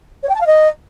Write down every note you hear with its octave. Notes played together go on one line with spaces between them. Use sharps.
C#5
G5
A5
F5
D#5